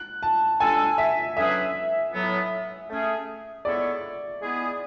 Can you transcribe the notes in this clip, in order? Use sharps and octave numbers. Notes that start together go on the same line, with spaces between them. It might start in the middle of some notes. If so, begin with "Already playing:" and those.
Already playing: F#6
A5
D3 G#3 D4 A4 G#5
E5
D3 F#3 C#4 G#4 B4 E5
A2 F#3 B3
A3 C#4 G#4
G#3 B3 E4 A4 C#5 D5
G#3 B3 E4 G#4